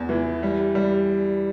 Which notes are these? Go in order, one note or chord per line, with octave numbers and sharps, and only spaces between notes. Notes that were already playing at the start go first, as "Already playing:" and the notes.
Already playing: E2
E3
G3
G3